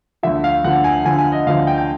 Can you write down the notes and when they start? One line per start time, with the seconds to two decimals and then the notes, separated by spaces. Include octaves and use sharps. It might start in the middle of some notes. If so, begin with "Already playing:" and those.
0.23 D2 D3 F3 E5
0.44 F5
0.64 D2 D3 F3 F#5
0.84 G#5
1.05 D2 D3 F3 G#5
1.18 G#5
1.32 D#5
1.47 D2 D3 F3 F5
1.67 G5
1.78 G5